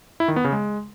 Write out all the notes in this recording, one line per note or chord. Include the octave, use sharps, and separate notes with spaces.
E4
D#3
B3
C#3
G#3